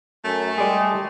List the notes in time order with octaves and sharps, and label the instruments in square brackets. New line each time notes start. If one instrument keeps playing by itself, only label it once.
[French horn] F#2 [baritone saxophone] A3
[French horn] G3 [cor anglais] G#3 [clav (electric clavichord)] G#4 D5